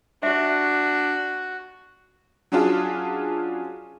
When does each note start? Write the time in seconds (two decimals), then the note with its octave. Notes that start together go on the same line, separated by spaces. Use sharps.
0.23 D4 F#4 E5
2.52 F#3 C#4 D4 F4 G#4